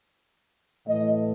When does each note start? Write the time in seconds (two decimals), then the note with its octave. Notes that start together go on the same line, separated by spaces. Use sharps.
0.87 A2 E3 A3 D#5